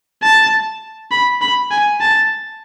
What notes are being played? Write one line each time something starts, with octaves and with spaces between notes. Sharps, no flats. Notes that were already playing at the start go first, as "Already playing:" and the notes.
A5
B5
B5
G#5
A5